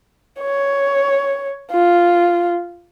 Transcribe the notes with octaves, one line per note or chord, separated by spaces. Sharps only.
C#5
F4